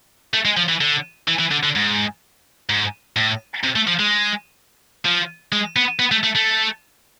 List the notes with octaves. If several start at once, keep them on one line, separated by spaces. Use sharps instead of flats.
A3
G#3
F3
E3
D3
E3
E3
D3
D3
G#2
G#2
A2
C3
A3
F3
G#3
F3
G#3
B3
B3
A3
A3
A3